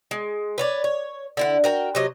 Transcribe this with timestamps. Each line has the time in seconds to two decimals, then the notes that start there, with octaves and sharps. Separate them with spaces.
0.11 G#3
0.58 B4 C#5 D5
0.84 C#5
1.37 D3 E4 F#5
1.64 F#4 A#4 G5
1.95 C3 F#3 D#5